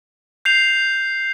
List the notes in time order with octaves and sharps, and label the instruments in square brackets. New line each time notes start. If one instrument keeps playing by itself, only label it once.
[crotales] G6 C7 F7